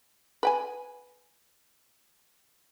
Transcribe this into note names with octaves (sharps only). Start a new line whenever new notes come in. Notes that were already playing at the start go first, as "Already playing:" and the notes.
B4 G5 G#5